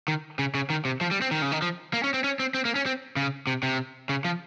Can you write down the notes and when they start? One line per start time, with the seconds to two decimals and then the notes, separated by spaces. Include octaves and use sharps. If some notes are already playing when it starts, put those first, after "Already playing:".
0.08 D#3
0.39 C#3
0.55 C#3
0.70 D#3
0.85 C3
1.01 F3
1.11 G3
1.22 C4
1.31 D#3
1.42 C#3
1.52 D#3
1.62 F3
1.93 A#3
2.04 C#4
2.14 C4
2.24 C#4
2.40 C4
2.54 C4
2.65 A#3
2.76 C#4
2.86 C4
3.16 C#3
3.47 C3
3.63 C3
4.09 C#3
4.25 F3